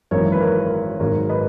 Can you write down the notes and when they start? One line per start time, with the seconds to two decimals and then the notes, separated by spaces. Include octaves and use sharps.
0.11 G#1 F#2 E3 A#4 C#5
0.32 B4
0.41 A#4 C#5
1.00 G#1 G#2 D#3 F#3 A#4 C#5
1.29 B4 D#5